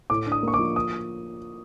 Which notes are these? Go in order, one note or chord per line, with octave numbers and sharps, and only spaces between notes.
A2 D6
D4
D#6
A#3 C#6
D6
F3
D#6